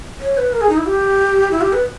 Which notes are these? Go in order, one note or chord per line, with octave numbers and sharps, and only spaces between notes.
C#5
B4
A#4
G#4
D#4
E4
G4
E4
G4
B4